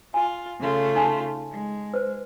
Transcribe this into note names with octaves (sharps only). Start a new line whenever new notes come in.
F4 G#5
C#3 A3 F4
D#4 G#5 A5
G#3
B4 C5